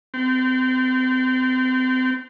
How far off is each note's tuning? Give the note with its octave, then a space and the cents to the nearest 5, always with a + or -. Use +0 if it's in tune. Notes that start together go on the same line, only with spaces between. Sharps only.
C4 -30